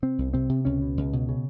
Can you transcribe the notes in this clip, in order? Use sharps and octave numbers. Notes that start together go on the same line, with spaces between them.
C3 C4
C2
C3 C4
C3
C#2 C#4
B2
C#2
B2
C#3